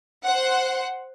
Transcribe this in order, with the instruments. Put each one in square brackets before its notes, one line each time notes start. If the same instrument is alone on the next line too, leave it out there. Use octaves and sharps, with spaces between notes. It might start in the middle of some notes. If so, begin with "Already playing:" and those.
[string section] C5 F#5